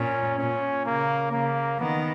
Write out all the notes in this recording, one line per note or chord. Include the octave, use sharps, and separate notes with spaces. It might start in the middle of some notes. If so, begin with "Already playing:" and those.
Already playing: A#2 C#4
A#2 C#4
C#3 A#3
C#3 A#3
D#3 B3